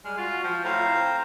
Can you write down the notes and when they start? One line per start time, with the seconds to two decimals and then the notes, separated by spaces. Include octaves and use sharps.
0.05 G3 G#3 F6
0.18 F4 F#4
0.44 F3 G5
0.64 A2 C5 F5 A#5
0.85 C4